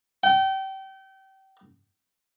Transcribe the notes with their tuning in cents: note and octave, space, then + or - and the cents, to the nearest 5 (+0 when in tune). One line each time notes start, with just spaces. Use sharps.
G5 -30